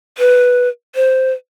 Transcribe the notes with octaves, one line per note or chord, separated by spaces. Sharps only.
B4
C5